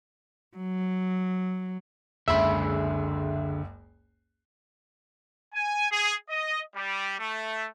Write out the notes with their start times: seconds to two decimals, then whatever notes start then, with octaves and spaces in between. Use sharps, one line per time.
0.57 F#3
2.28 F#1 C#2 D3 G#4 E5 B5 C6
5.54 G#5
5.91 G#4
6.29 D#5
6.75 G3
7.18 A3